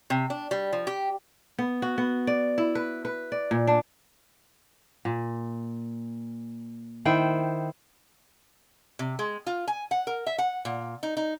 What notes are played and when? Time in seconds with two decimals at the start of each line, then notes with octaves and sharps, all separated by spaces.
0.10 C3
0.30 D4
0.51 G3
0.73 F3
0.87 G4
1.59 B3
1.82 F#4
1.98 B3
2.27 D5
2.58 E4
2.75 B4
3.05 B4
3.32 D5
3.51 A#2
3.67 D4
5.05 A#2
7.05 D#3 E4 C5 G5
8.99 C3
9.19 G#3
9.47 F4
9.68 G#5
9.91 F#5
10.07 A#4
10.26 E5
10.38 F#5
10.65 A#2
11.03 D#4
11.17 D#4